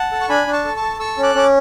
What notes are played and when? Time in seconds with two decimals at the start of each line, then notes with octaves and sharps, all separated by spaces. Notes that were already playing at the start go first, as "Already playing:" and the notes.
Already playing: F#5 A5
0.12 A4
0.21 C#6
0.29 D4 G#5 B5
0.47 D4
0.53 A5 C#6
0.65 A4
0.76 A5 C#6
0.82 A4
0.99 A4 C#6 E6
1.18 C#4
1.23 D6 F#6
1.35 C#4 D6